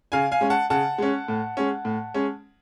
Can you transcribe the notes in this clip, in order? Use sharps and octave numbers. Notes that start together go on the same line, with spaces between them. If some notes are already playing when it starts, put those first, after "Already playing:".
C#3 F5 G#5
F5 G#5
G#3 C#4
F#5 A5
C#3 F#5 A5
G#3 C#4
A2
G#3 C#4
A2
G#3 C#4